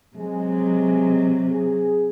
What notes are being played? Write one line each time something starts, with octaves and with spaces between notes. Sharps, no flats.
C3 F#3 G#3
G#4